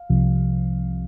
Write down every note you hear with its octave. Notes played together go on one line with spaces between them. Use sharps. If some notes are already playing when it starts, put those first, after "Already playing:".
Already playing: F5
C2 C3 F3